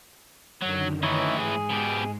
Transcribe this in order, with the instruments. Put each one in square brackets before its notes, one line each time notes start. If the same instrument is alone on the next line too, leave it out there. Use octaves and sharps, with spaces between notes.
[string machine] F#2 D3 D#3 [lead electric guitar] F#3
[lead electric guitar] A2 E3 [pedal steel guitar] D#4 E4 C#5
[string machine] G#2 G#3 [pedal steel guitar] G#4
[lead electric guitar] B2 G4